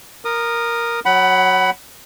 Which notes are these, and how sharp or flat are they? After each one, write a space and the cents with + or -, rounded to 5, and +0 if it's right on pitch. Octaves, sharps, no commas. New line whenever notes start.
A#4 +5 D#6 -20
F#3 -5 F#5 +25 B5 +0